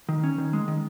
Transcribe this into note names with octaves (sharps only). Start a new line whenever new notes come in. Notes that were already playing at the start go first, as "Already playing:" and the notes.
D#3
C#4
D#3
G#3
D#3